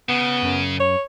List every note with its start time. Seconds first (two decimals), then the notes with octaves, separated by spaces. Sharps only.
0.09 C#3 B3
0.43 F#2
0.80 C#5